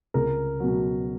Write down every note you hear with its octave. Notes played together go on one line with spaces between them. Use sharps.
C#2 A#4
B2 F#3